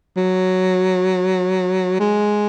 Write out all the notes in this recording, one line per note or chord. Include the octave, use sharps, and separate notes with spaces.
F#3
G#3